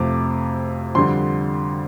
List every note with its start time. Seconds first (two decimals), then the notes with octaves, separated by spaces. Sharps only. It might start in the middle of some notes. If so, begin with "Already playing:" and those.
Already playing: F2 C3 A3 F4 D6
0.95 F2 D3 G3 C6